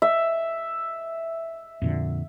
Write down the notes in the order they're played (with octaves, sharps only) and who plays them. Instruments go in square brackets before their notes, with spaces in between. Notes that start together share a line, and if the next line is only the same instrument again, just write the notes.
[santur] E5
[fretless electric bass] F2 A#2 D3